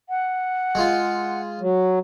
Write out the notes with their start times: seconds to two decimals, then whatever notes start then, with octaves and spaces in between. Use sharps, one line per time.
0.09 F#5
0.75 G#3 F4
1.60 F#3